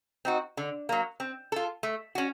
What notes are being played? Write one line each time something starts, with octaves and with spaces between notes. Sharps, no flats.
C4 D#4 F#4
D3
F#3 A#3
C4
F4 A4
A3
C#4 F#4